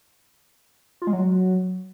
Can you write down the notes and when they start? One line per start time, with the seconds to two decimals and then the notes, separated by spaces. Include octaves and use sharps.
1.02 F4
1.07 G#3
1.13 F#3